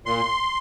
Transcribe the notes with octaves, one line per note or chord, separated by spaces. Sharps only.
A#2 C6